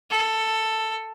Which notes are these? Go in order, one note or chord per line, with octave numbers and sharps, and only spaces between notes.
A4